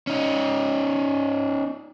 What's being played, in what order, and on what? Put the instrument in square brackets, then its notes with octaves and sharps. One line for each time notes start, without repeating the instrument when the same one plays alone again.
[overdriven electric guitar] C#4 D#4